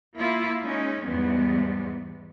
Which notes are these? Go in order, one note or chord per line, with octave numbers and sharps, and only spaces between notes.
A#3 E4 F4
G#3 C#4 D#4
E2 G#2 G3 B3